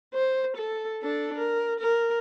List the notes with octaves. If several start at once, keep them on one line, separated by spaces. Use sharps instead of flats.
C5
A4
D4 A4
A#4
A#4